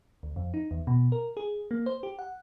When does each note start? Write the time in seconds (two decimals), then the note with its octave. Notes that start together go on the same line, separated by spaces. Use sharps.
0.23 D2
0.36 F2
0.54 D#4
0.71 E2
0.87 B2
1.12 A#4
1.37 G#4
1.71 A#3
1.86 C5
2.03 G4
2.19 F#5